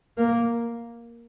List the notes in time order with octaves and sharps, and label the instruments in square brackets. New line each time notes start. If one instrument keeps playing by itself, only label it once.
[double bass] A#3